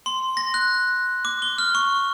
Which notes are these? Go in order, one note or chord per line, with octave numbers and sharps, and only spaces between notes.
C6
A#6
F#6
D6
G7
F6
C#6